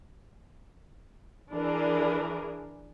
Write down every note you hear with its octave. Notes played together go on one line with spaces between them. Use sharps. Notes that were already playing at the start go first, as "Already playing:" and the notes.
E3 D4 G#4 A#4